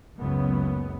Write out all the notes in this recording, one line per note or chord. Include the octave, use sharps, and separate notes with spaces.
F#1 C#2 F#2 C#3 B3